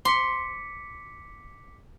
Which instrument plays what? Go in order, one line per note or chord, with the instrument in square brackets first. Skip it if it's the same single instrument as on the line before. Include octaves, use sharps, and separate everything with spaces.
[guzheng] C6 [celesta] D6 B6 C#7